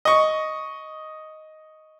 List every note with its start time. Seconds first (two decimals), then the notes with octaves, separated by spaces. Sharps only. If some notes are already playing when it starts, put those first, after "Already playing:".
0.05 D#5 C#6